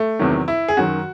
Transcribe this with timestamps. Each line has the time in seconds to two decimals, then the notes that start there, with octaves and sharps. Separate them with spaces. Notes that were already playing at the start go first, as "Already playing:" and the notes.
Already playing: A3
0.19 E2 C3 D#3 F#3
0.48 E4
0.68 G#4
0.77 F#2 D#3 F#3 F#4